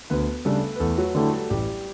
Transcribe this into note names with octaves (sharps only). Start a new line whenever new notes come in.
D2 B3 B4
C#3 G3 A3 D4 A4
B4
E2 A3 A4
F#3 F#4
D3 G3 A3 E4 G4
A3 A4
A1 G3 G4